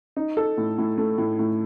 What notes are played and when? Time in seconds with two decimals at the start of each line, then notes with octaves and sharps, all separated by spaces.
0.17 D#4
0.37 A4
0.58 A2
0.78 A2
0.98 A3
1.18 A2
1.39 A2